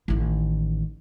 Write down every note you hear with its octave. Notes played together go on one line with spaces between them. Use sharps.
A1 D#3